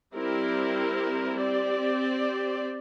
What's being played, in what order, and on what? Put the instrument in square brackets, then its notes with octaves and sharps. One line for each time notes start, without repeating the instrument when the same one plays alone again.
[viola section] G3 C4 E4 G4 A#4
C4 G4 D5